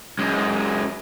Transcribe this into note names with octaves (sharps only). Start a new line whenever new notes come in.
F#2 G#3